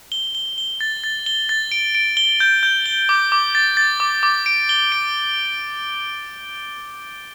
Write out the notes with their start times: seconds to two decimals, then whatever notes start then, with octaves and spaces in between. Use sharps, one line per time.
0.12 G7
0.35 G7
0.58 G7
0.81 A6
1.04 A6
1.26 G7
1.49 A6
1.72 D7
1.95 D7
2.17 G7
2.40 G6
2.63 G6
2.86 G7
3.09 D6
3.32 D6
3.55 A6
3.77 A6
4.00 D6
4.23 D6
4.46 D7
4.69 G7
4.92 D7